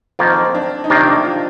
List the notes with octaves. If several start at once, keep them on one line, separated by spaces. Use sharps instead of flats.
F2 D#3 A#3 C4 F4
C4
D4
D#4
C3 D#3 A#3 D4 F4
D4
F4